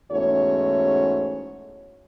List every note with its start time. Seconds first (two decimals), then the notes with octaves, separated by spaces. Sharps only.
0.11 E2 G#2 A3 C#4 F#4 C#5